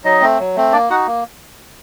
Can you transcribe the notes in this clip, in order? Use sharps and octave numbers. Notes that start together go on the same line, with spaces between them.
F#3 D#4 D#5
A3 C4
F#3
A3 C4
A#3 D4 D5
D#4 F#4 F#5
A#3